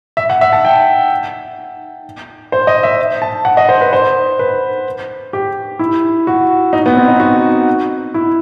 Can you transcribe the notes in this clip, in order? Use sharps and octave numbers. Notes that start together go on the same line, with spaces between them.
E5
F#5
E5
A5
G5
C5
D#5
E5
A5
F#5
D#5
C5
B4
C5
B4
G4
E4
F#4
D#4
B3
C4
D#4
F#4
E4